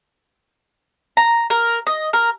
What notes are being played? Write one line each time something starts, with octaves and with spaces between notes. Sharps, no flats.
A#5
A#4
D#5
A#4